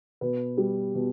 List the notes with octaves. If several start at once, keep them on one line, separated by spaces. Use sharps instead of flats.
B2 B4
G3
B2